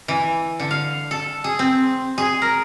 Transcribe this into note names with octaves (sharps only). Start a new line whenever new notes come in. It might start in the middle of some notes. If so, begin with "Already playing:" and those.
E3
D3
F5
A4
G#4
C4
G#4
A#4